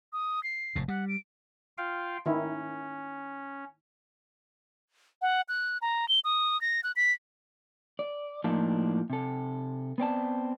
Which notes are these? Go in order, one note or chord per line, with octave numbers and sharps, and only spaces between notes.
D#6
C7
F1 A2
G3 F#5
D7
F4 F5 G5
D#3 C#4 E4
F#5
F#6
A#5
G7
D#6
A#6
F#6
B6
D5
A2 F3 A#3 D4 D#4 F4
C3 A4
B3 C4 D5 A5